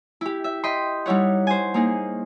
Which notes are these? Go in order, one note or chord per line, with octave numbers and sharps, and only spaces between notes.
E4 G4
E5
D#5 G5 B5 C6
G3 D#4 E4 C#5 F#5
C5 G#5
A#3 D#4 G#4